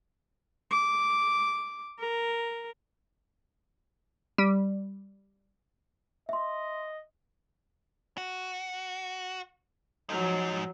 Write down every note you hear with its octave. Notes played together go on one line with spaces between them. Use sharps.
D6
A#4
G3
D#5 E5 C6
F#4
G#2 F3 F#3 D#4